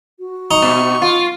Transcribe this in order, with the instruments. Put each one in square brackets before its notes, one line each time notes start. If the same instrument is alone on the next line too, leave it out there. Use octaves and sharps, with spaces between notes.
[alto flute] F#4
[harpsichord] D#4 [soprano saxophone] C#6
[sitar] B2
F4